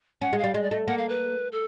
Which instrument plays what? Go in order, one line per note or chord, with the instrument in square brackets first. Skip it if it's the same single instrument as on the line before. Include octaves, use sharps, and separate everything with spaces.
[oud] C#4 [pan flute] F#5
[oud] G#3
[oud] G3 [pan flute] F5
[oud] G#3 [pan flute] D#5
[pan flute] D5
[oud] A3 [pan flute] D#5
[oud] A#3 [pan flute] F#5
[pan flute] F5
B4
A4